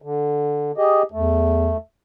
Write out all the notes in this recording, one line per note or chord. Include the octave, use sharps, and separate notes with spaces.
D3
G4 G#4 D#5
E2 A3